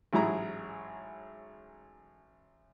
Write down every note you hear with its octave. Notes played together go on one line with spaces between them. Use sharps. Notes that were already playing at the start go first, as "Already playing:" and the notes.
A1 G#2 F#3 E4 G#4 A#5